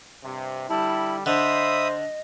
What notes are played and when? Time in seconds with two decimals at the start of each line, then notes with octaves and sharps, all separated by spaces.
0.23 G2 C3
0.70 D3 G3 E4 A5
1.26 D3 C5 D#5 E5 B5 D#6